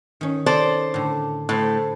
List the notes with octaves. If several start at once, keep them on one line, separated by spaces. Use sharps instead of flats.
D#3 C#4
A4 C5 D5
A2 D3
A2 A4 C5